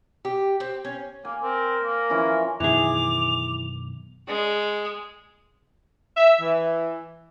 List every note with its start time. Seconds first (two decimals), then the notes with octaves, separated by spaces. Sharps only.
0.25 G4
0.60 C4
0.85 C#4
1.25 A#3 G#5
1.42 C4 A#4
1.83 A#3
2.10 E3 F3 C#4
2.60 F#2 B2 D#3 E3 G#4 D6 F7
4.28 G#3
6.17 E5
6.41 E3